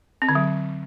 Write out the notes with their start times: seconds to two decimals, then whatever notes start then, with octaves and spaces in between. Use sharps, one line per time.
0.22 C4
0.29 D3
0.35 F#3